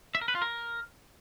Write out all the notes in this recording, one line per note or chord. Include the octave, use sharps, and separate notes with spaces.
E5
A#4
B4
F4
A#4